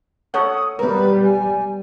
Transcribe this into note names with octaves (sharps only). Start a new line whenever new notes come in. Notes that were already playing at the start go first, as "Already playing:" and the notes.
A4 C#5 F#5 D#6
G3 B3 A#4 B4
G#5